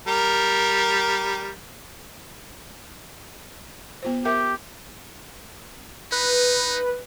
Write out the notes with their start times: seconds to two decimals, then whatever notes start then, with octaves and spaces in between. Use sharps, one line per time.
0.08 G3 A#4
4.03 B3 F4 C5
4.25 G4 A#4 E5 G5
6.12 D#4 B4